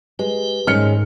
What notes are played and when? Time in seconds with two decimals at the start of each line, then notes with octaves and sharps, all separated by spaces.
0.19 G#3 G4 B4
0.67 G#2 D#3 G#3 C#4 F6 C#7